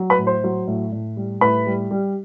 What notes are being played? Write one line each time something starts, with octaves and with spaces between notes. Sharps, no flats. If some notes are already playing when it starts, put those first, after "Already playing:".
Already playing: F#3
B4 B5
A2
C5 C6
F#3
A2
A2
G3
A2 B4 B5
G3
G3